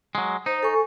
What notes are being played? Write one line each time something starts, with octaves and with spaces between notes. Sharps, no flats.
F#3 G#3
D#4 C5
A4 G#5 C#6